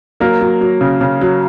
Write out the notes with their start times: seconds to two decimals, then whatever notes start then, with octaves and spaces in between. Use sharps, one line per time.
0.20 F#3 A#3 A#4
0.41 F#3
0.61 F#3
0.81 C#3
1.01 C#3
1.21 F#3